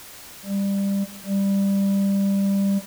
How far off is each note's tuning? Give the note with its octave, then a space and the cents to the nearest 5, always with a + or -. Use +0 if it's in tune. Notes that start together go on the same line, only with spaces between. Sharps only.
G3 +15
G3 +10